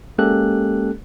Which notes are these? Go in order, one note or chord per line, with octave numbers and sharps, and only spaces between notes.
G#3 A#3 C#4 G4 A4 F#6